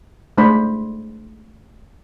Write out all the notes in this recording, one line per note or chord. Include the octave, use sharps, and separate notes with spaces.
G#3 A3 D4 C5 B5